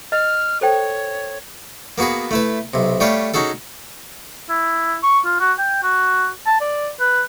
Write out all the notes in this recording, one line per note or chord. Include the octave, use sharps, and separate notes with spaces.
D#5 F6
A4 C5 C#5 G5
A#3 B3 F#4 G#4 B4
A3 E4 B4
B1 C3
G3 A3 G4 C#5 F5
C#4 D#4 F#4 G#4 A4
E4
C#6
F4
F#4
G5
F#4
A5
D5
B4